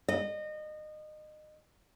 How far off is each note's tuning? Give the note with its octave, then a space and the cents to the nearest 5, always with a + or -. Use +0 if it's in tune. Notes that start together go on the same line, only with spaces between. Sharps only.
D#5 -25